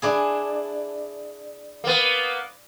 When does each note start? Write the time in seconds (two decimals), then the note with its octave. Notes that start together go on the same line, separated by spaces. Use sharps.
0.02 D4 E4 G#4
1.84 A#3 B3